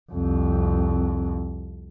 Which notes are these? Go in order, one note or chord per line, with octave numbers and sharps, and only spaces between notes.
C2 F2